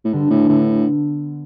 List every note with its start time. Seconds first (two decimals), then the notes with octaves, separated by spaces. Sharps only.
0.05 A2
0.13 G2 D3
0.30 A2 B3
0.48 A2 D3